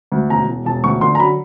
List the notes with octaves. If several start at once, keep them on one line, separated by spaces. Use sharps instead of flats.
D2
E1 A#5
E1
E1 A5
D2 C#6
D3 C6
A#5
F#3 B5